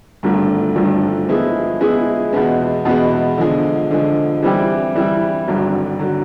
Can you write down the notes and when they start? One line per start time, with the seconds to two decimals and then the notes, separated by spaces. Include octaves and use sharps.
0.23 G#1 G2 D3 F3 A3
0.75 G#1 G2 D3 F3 A3
1.29 F3 G#3 B3 E4 G#4
1.81 F3 G#3 B3 E4 G#4
2.33 E2 B2 G#3 B3
2.85 E2 B2 G#3 B3
3.37 D3 F3 G#3
3.91 D3 F3 G#3
4.42 E3 G3 C4 E4 G4
4.95 E3 G3 C4 E4 G4
5.48 G#1 G2 D3 F#3
5.99 D3 F#3